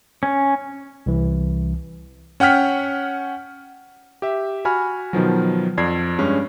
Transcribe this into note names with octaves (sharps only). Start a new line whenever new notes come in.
C#4
C2 E3
C#4 F#5 G5 F6 B6
G4 E5
F#4 G#5 B5 F6
B2 D#3 F3 F#3
F2 D5 G#6 C7
G2 G#3 C#4